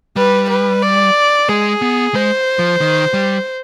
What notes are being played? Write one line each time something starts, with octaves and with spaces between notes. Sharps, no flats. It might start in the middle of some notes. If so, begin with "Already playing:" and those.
G3 B4
B4
D5
G#3 G#4
B3
G#3 C5
F3
D#3
G3